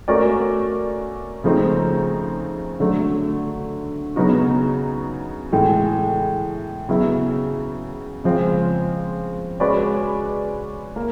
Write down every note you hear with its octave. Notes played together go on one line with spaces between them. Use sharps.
A3 C#4 F#4 A#4 D5
C#3 F3 A3 C4 D#4
D3 F#3 A3
C#3 F#3 B3 D#4 F#4
A2 E3 G#3
C#3 F#3 B3 E4
C#3 F3 G#3 C4 F4
G#3 C#4 F#4 B4 D5
A#3